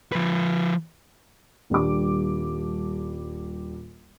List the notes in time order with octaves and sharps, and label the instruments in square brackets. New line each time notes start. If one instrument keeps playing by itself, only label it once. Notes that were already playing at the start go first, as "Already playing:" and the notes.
[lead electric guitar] F3 B4
[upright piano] D#1 G3 D4 D6